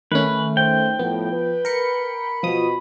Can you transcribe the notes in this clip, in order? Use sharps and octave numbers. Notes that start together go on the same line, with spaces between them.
D#3 A3 C#4 B4
C5 G5
A2 F3 B3
B4
A#4 B5 C#7
B2 F3 D#6